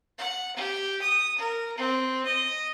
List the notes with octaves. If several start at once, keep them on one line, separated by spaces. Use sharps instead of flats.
F#5
G4
D#6
A#4
C4
D#5